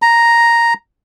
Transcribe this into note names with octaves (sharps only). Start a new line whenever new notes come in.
A#5